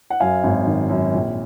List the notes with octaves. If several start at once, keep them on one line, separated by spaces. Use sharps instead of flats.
F#5
F#2 F5 G#5
G#1
D#3
F#2
A#1